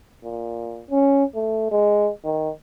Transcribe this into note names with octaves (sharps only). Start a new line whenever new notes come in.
A#2
C#4
A3
G#3
D#3